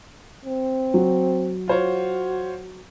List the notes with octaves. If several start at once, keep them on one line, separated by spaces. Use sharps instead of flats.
C4
F#3
F4 F#4 C5 C#5